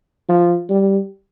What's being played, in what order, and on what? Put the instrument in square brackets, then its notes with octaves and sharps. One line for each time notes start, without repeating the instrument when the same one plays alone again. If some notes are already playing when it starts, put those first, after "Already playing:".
[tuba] F3
G3